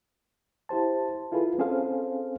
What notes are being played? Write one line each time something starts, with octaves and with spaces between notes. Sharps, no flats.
E4 G4 C5 A5
E4 F4 G#4 A4 B4
C4 C#4 G#4 A4 C5 F5